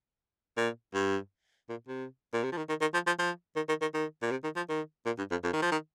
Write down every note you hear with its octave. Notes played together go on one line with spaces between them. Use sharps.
A#2
G2
A#2
C3
A#2
C3
F3
D#3
D#3
D#3
F3
F3
F3
D#3
D#3
D#3
D#3
A#2
C3
D#3
F3
D#3
A#2
G2
F2
F2
D#3
F3
D#3